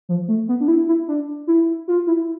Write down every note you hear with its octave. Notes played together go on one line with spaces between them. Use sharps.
F3
A3
B3
D4
E4
E4
D4
E4
F4
E4